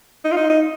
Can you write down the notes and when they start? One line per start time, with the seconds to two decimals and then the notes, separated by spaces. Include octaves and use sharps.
0.25 D#4
0.32 F4
0.37 D#4
0.50 D#4